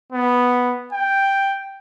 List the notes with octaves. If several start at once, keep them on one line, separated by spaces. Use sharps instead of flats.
B3
G5